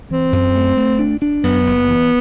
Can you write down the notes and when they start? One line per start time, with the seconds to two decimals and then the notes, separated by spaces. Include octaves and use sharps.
0.11 E3 C4
0.32 F#2
0.55 A3
0.77 A3
0.99 D4
1.22 D4
1.43 F#2 B3
1.66 F#1
1.88 E3